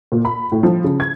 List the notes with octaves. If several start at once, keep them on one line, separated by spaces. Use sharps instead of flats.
A#2
B5
A2
F3
C#3
G#6